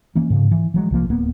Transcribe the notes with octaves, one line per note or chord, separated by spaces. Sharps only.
E3 A#3 C#4
G#2 C#3
E3
E3 F#3 G#3
C2 F3 A#3
D1 A#3 B3